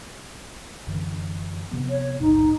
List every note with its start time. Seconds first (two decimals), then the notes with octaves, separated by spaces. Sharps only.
0.87 F#2 D3 E3
1.71 C3 F3 B3
1.90 C#5
2.20 A1 D2 G#2 D#4